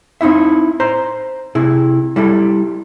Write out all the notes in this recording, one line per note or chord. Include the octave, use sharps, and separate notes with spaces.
C4 D#4 E4 E5
C5 A#5
C3 E4 G#4
G3 E4 G4 A4